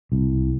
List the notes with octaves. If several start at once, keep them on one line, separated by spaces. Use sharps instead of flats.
C2